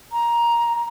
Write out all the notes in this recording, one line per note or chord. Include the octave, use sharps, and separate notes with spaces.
A#5